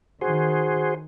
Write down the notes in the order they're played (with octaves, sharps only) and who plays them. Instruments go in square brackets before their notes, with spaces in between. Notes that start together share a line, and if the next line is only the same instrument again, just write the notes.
[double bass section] D#3 [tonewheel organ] F#4 G#4 C5